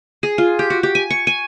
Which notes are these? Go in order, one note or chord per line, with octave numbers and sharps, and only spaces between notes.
G#4
F4
G4
F#4
G4
G#5
C#6
G#5